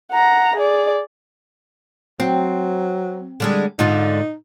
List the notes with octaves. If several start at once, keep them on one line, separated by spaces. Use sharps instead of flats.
F#5 A#5
G#4 D5
F#3 C4
D3 G3 G#3
G#2 D3 D#4 F4